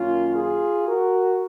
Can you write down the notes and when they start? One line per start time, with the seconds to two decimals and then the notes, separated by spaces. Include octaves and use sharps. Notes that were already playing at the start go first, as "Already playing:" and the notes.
Already playing: F#2 D#3 A#3 C#4 F4
0.35 F4 G#4
0.88 F#4 A#4